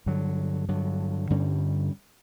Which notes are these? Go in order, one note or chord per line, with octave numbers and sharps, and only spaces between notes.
G2 D3 F#3
G2 D3 F#3
G2 D3 G3 C#4